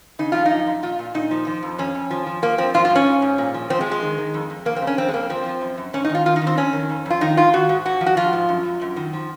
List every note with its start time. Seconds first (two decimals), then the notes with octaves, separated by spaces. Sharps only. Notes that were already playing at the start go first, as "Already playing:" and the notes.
0.19 C#3 D#4
0.32 F3 F4
0.45 D#4
0.51 F#2
0.67 F#2
0.83 A#2 F4
0.99 A#2
1.14 A#2 D#4
1.31 F3
1.47 F3
1.63 F2
1.78 F2 C#4
1.95 F2
2.10 F3
2.26 F3
2.42 F3 A#3
2.58 F3 C4
2.74 G#2 F4
2.85 F4
2.90 G#2
2.95 C#4
3.07 G#2
3.22 G#2
3.38 A#2
3.54 F3
3.70 F3 C4
3.81 G#3
3.86 F3
3.91 G#3
4.02 D#3
4.18 D#3
4.34 F2
4.50 F2
4.65 F2 A#3
4.76 C4
4.81 C#3
4.87 C#4
4.98 F2 C4
5.08 G#3
5.13 F2 A#3
5.30 F3 C4
5.46 F3
5.62 F#2
5.77 F#2
5.93 G#2 C#4
6.05 D#4
6.09 D#3
6.15 F4
6.26 D#3 F4
6.36 D#4
6.42 D#3
6.47 C4
6.57 F2 C#4
6.73 D#3
6.89 F2
7.06 F2 F4
7.21 D#3 D#4
7.37 G#2 F4
7.53 D#3 F#4
7.69 G#2
7.85 G#2 F#4
8.01 F3
8.06 F#4
8.17 F3 F4
8.33 G#2
8.49 F#2
8.65 F#2
8.81 F#2
8.96 D#3
9.13 F3